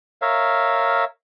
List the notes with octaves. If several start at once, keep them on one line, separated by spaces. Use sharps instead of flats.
A#4 C#5 E5 F5